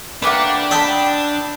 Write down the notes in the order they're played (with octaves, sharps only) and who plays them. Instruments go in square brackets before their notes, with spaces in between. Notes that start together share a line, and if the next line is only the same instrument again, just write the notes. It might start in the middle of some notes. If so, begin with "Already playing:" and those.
[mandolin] A3 A#3 G4 [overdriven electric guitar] D4 [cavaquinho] B4 F#5
[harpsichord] D#5 E5 A5 [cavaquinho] G5 B5 [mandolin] E6